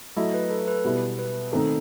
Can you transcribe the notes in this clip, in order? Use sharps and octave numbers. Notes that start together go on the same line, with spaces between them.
F#3 A3 E4 D#5
B4
A4
B4
B2 G3 B3 E4
B4
D#3 A3 C4 D#4 A4